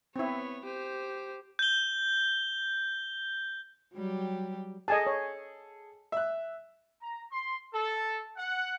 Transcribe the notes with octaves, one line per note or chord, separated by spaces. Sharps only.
B3 C4 E4 C#5
G4 C5
G6 G7
F#3 G3 G4
G#4 A4 D#5 G#5 A5
C#5
E5 F#6
A#5
C6
A4
F#5